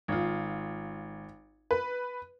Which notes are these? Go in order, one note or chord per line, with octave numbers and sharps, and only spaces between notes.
G#1 F4
B4